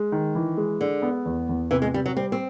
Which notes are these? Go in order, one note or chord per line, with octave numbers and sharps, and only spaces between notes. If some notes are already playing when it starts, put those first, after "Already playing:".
Already playing: G#3
D#3
E3
G#3
D3 G#3
B3
E2
E2
C3 E3
G#3
C3 G3
F#3
G3 C4
C4